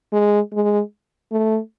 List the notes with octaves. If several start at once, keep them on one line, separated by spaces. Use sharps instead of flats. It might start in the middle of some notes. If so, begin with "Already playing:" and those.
G#3
G#3
A3